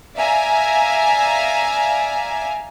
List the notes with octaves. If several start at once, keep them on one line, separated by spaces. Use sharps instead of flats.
D5 E5 F5 G#5 A#5